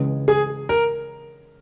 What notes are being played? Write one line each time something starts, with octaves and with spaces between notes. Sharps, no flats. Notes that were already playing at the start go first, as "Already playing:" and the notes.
Already playing: C#2 C#3 E3 G#3
G#4
A#4